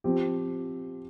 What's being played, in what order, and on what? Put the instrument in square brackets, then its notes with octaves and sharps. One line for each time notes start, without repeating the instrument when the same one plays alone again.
[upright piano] F3 C4 G4